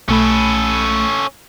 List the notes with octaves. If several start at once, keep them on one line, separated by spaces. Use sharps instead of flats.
B1 A3 C#4 A4 B5